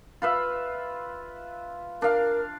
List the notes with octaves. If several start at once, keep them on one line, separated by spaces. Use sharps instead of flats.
F4 B4 E5
D4 A#4 F5